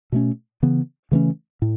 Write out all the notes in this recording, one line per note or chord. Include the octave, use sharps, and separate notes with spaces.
B2 A3 C#4
C#3 E3 B3
C#3 E3 A3 C#4
A2